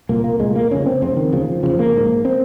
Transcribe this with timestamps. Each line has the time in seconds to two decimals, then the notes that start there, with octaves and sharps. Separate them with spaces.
0.09 C2 A#2 A#3
0.24 A#3
0.39 C2 A#2 G#3
0.55 A#3
0.70 F1 F2 C#3 C#4
0.86 C4
1.02 F1 F2 C#3 C4
1.17 D#3
1.32 F1 D#2 C#3 F3
1.63 F1 D#2 C#3 F3
1.79 A#3
1.94 A#1 G#2
2.25 C4